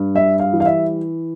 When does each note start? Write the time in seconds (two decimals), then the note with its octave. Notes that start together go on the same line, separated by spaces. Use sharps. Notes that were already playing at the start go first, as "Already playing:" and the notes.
Already playing: G2
0.15 G3 E5
0.39 F5
0.53 E3
0.60 F5
0.66 E5